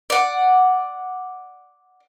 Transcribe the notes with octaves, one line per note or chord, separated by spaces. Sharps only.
D5 F#5